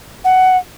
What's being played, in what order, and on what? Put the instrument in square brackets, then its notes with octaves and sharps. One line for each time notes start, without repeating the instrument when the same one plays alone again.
[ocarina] F#5